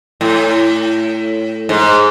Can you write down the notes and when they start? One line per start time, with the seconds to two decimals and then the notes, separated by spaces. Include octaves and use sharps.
0.21 A2
1.69 G#2